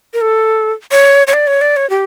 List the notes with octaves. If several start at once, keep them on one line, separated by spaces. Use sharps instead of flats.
A#4
A4
C#5
C#5
D5
C#5
D5
C#5
G4